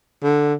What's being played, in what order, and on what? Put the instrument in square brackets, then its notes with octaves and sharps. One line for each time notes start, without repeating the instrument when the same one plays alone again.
[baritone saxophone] D3